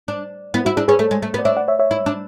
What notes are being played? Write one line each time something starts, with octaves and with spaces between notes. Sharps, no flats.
D4
B3 E4
E4 F#4
D4 E4 G#4
C#4 G#4 B4
A3 A4 C#5
G#3
A3
B3
D5
D4 C#5 E5
D5 F#5
C#5 E5
C#5 E5
E4
D4